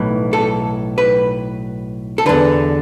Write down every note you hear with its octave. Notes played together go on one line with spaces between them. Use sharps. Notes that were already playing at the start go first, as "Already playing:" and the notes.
Already playing: B1 A2 E3
A4
B4
A4
E2 D3 B4